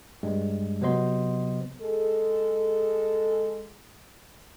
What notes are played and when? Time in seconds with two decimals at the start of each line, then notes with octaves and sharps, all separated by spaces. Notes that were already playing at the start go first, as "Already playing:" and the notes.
0.23 G2 G3 G#3
0.81 C3 F#3 B3 C5 D#5 C6
1.81 G#3 A4